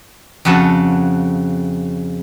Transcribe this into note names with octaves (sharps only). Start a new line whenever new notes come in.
F2 C#3 F#4 A4 A5